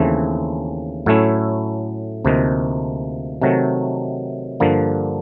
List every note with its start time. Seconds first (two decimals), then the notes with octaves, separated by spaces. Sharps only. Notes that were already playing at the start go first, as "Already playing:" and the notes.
Already playing: D#2 C#3 E3 A3 C4
1.06 A2 F#3 A3 C#4 E4
2.25 D2 C3 F3 A#3 D#4
3.42 C3 D#3 F#3 A3
4.60 G2 D3 F3 A#3